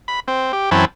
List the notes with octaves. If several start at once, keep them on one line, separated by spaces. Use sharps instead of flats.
B5
C4
G4
F#2 E3 C4 C#4 B4 A5